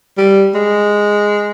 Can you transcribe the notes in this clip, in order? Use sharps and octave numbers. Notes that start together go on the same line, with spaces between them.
G3
G#3